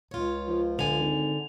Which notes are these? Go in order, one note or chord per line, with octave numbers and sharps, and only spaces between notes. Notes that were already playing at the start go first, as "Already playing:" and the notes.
C#2 F4 C#5
F3
D3 G#5 F7
G#1